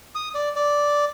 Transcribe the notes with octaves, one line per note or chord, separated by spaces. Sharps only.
D#6
D5
D5